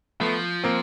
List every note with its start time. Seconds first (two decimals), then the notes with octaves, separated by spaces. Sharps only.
0.20 F3 A3 B3
0.64 A#3 C4